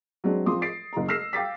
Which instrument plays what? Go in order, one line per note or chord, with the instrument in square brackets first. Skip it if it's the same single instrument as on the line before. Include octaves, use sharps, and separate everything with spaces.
[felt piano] F#3 G#3 C4 D4
F3 C4 C6 D6 D#6
A6 C7 D7
F#1 A#5
E6 F6 A#6 C7 E7
F5 G5 D6 A6 B6